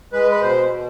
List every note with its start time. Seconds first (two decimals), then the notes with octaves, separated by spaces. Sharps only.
0.13 G#3 B4
0.31 B4
0.42 B2 C5
0.71 B2